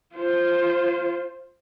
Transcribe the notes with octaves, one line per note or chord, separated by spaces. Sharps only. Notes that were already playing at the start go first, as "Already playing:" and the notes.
F4 C5